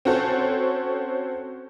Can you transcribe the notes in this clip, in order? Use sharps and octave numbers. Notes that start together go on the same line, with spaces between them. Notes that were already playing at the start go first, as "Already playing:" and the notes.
C4 C#4 F#4 A4 C5 C#5